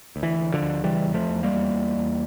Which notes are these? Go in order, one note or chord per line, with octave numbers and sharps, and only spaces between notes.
D2
E3
D2
D3 F3
D2
C#3 E3 G3
E2
F3 A3
E2
G3 A#3
E2
E2
E2